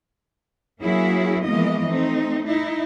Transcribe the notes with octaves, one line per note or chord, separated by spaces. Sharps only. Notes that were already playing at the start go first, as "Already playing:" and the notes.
F#3 A#3 C#4 E4 F#4 G#4
E3 F3 G#3 A#3 B3 D#5
A3 C4 D#4
D#4 E4